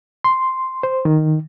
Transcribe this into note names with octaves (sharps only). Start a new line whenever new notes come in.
C6
C5
D#3